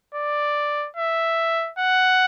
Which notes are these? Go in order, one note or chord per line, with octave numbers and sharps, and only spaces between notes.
D5
E5
F#5